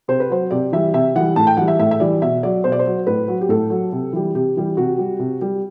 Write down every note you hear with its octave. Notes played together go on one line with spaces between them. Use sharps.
C3 C5
B4
F#3 C5
C3 D5
E3 G3 E5
C3 E5
E3 G3 F#5
A2 A5
G5
E3 G3 F#5
E5
A2 E5
E5
E3 G3 D5
B2 E5
F#3 D5
B2 C5
D5
C5
F#3
A2 B4
F#3
G4
A2 A4
F#3
C3
E3 G3
C3 G4
E3 G3
C3 F#4
G3
C3
G3